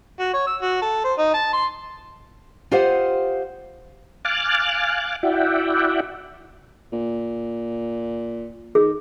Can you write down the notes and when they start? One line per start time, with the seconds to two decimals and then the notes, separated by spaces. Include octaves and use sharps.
0.20 F#4
0.34 C#5
0.47 E6
0.62 F#4
0.82 A4
1.05 C5
1.18 D#4
1.34 A5
1.53 C6
2.71 F4 G4 C5 D#5 F5 F#5
4.25 F5 G#5 D6 F6 F#6 A6
5.23 E4 F#4 D5 E5 F#5 G5
6.93 A#2
8.75 D#3 G#4